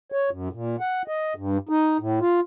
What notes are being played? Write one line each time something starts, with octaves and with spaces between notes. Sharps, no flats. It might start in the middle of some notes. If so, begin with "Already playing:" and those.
C#5
F#2
A#2
F#5
D#5
G2
D#4
A2
F4